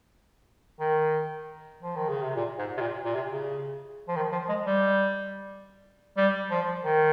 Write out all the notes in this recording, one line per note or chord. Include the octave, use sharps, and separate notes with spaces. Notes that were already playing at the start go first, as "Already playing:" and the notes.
D#3
F3
D#3
C#3
C3
A#2
G#2
C3
A#2
A#2
C3
C#3
F3
D#3
F3
G#3
G3
G3
F3
D#3